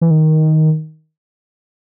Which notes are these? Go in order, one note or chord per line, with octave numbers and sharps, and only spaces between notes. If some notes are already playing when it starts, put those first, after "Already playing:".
E3
D#3